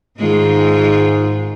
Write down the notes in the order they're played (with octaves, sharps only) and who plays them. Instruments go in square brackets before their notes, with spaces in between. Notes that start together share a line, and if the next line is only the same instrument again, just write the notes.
[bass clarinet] G#2 [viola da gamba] D#3 G#3 F4